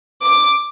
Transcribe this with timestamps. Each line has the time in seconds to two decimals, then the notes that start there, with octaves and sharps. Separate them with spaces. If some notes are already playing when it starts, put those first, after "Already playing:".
0.22 D6